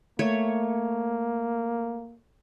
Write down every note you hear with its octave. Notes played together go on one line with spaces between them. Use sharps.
A3 A#3 C#5